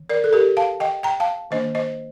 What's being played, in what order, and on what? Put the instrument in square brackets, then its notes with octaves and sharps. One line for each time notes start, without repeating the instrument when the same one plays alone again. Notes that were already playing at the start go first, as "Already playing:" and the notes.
Already playing: [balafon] D#3
A#4 D5
A4
G4 A#4
F5 A5
D#5 G5
G5 A#5
F5 A5
D#3 A#3 D4 C5 D#5
C5 D#5